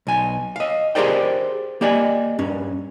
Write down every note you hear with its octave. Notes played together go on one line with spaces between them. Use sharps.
B1 G#5
D#5 F5
G4 G#4 A#4 C5 D5 G5
A#3 G4 D5 D#5 G#5
G2 C#4